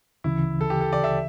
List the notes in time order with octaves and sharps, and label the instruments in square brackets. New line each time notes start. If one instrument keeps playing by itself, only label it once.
[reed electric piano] D2 C#3 E3 [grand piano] E4
[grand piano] A4
G4
A4
D5
E5